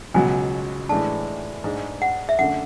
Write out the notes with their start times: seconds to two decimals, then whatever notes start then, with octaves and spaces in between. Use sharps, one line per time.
0.14 C#2 B2 F#3 G#5
0.89 A2 E3 G#3 D4 A5
1.64 G#2 G#3 D4
2.02 F#5
2.29 E5
2.39 F#2 D3 A3 F#5